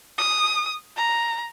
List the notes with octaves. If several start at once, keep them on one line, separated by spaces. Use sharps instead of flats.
D#6
A#5